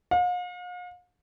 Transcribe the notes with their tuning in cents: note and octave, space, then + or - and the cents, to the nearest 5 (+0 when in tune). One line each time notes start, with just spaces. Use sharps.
F5 +45